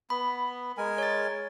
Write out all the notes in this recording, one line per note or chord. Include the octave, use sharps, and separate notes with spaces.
B3 B5
G#3 A#4 G#5
C#5 A6